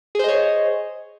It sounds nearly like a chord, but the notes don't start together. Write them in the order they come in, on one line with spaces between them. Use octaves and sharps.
G#4 C5 D#5 C#5